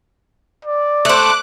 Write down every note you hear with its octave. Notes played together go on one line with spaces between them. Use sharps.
D5
A3 C5 D6 F#6